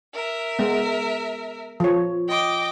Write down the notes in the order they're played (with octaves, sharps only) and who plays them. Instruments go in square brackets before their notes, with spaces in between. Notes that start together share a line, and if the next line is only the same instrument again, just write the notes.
[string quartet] A#4 E5
[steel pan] G#3 B3
F3 C#5
[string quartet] D#5 G5 D6